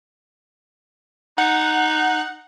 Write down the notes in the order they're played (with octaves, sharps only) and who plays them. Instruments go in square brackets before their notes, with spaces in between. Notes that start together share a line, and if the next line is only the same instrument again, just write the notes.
[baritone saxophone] D#4 [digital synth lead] F#5